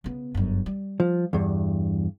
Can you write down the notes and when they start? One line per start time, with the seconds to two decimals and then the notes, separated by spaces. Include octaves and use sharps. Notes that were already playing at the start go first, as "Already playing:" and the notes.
0.04 C#3 B3
0.35 G1 F#2
0.66 G3
1.00 F3
1.33 E2 G2